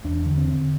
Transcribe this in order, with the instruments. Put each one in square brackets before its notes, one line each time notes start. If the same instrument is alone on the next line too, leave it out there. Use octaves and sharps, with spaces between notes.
[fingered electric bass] E2 D4
D3
C4
D3